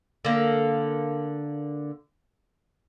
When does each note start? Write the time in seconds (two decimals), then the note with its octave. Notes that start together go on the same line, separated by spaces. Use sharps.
0.25 D3 A#3